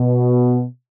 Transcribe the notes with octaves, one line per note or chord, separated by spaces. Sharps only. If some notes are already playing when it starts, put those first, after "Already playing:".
Already playing: B2